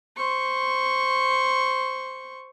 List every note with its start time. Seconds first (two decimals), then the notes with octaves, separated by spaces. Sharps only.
0.17 C5 C#6